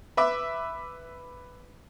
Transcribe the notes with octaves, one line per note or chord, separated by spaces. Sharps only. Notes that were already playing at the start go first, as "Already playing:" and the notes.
B4 E5 D6